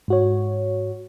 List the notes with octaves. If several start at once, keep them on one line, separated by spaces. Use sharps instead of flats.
G#2 F#4 C#5